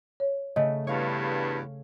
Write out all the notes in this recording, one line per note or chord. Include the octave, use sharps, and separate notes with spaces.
C#5
C#3 A3 D#5
E2 G2 C#5 F5